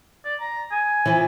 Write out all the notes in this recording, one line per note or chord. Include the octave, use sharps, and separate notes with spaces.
D5
A#5
G#5
E3 F3